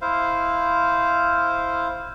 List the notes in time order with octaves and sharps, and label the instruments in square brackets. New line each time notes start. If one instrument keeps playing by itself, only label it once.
[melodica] E4 C5 F5